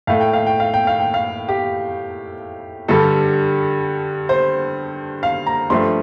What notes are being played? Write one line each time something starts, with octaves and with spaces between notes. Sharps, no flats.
A2 A3 F5
G5
F5
G5
F5
G5
F5
G5
F5
G4
G2 D3 G3 A4
C5
F5
A#5
G2 F3 A3 C6